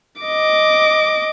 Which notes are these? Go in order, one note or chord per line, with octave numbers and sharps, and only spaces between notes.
D#5 D6